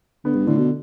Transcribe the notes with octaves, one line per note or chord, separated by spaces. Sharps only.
D3 B3
G2
A2 D3
B2